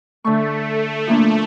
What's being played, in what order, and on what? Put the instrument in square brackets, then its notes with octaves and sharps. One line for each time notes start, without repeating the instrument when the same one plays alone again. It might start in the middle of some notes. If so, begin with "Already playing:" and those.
[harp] D3 C#6 [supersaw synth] A3
[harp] F3 A#3 D4